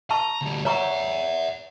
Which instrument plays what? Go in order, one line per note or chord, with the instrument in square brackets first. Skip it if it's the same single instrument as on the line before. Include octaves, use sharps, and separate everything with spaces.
[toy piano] A5 C#6 [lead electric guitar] A#5
[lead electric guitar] D2 G3
[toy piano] C#5 A#5 C#6 [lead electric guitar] E5 F#5